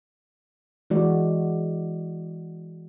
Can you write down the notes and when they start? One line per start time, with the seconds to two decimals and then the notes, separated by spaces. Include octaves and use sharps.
0.90 E3 G#3 F#4 D5